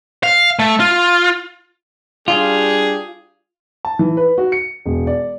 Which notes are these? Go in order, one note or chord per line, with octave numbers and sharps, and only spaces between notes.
F5
A3
F4
G3 D4 F4 G4 G#4
A5
E3
B4
F#4
C#7
E1
D5